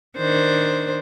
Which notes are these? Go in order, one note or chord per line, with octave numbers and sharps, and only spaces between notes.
D#3 D4 C5